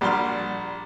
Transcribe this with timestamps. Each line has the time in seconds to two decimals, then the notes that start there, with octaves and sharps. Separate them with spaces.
0.01 A#1 G3 F#4 C6 F6